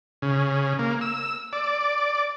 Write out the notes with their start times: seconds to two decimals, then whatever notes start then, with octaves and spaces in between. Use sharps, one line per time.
0.22 C#3
0.79 A#3
1.01 E6
1.53 D5